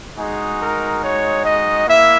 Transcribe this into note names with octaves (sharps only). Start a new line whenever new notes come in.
G#3 D#4 F#4 G#4
A#4
C#5
D#5
A#3 E4 E5